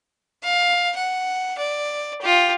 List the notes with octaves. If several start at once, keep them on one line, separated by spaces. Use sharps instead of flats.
F5
F#5
D5
F4 G4